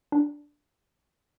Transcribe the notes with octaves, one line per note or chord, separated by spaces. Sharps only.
D4